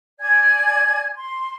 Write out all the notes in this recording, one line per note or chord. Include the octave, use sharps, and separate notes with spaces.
D5 G#5 G#6
C6